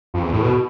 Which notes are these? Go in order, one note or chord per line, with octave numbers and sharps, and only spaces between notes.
F2
E2
A2
B2